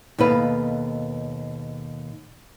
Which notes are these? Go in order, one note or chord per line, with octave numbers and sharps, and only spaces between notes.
D#2 B2 A4 B4 F5